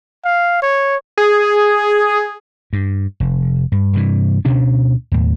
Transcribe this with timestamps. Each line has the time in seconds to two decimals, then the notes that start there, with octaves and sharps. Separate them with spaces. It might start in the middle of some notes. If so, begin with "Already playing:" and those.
0.25 F5
0.63 C#5
1.18 G#4
2.73 G2
3.20 F1
3.72 G2
3.93 G2 C3 E3
4.45 D2 B2 C#4 D4
5.12 D#2 A2